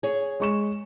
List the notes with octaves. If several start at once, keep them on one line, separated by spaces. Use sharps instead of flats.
G#4 C#5
G#3 C#6 E7